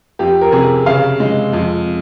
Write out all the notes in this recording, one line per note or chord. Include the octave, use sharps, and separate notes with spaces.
F2 G4
A#4
C3 G#4
C#3 F5
G#3
F2